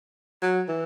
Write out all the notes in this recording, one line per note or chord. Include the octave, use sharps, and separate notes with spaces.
F#3
E3